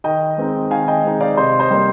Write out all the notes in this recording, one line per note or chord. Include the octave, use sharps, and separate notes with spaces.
D#3 D#5 G5
G#3 C4 D#4
D#3 F5 G#5
D#5 G5
G#3 C4 D#4
D5 F5
C3 C5 D#5
C5 D#5
G3 A#3 C5